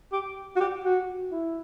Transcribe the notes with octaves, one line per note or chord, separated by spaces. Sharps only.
G4
F#4
G4
F#4
E4